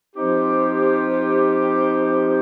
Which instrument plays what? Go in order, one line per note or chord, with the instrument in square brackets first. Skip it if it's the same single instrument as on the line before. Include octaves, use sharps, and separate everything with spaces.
[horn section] F3 C4 D#4 G4